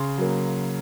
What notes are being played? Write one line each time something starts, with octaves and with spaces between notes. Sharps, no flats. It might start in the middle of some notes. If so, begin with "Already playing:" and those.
Already playing: C#3 C6
F#3 A#3